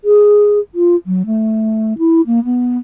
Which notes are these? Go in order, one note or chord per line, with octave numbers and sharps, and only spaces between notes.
G#4
F4
F#3
A3
E4
A#3
B3